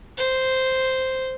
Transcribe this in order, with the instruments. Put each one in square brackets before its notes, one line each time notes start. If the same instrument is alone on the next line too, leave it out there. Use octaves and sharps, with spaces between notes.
[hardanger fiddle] C5